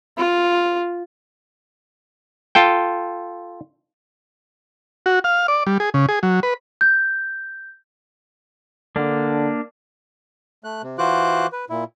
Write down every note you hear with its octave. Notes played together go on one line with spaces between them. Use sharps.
F4
F4 A4 G5
F#4
F5
D5
G3
G#4
C#3
G#4
F#3
B4
G6
D3 A#3 D4
A3 F#6
C3
E3 F4 F#4 C5 D6 F#6
B4
A#2 E4